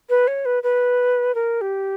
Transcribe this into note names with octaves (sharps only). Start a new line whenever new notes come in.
B4
C#5
B4
B4
A#4
G4